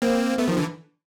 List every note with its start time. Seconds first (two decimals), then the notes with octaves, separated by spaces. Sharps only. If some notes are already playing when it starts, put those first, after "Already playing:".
0.02 A#3 C4
0.38 A3 B3
0.47 D#3 F3
0.57 D3 E3